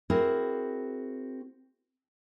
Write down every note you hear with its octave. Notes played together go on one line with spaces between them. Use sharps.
C4 E4 F#4 G#4 A#4